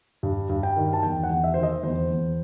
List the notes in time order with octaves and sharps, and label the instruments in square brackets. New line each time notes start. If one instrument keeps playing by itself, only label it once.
[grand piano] G2
G2
G5
D#3
A5
E2 G5
F#5
E2
E5
D#3 C5
D#5
E2 C5
E2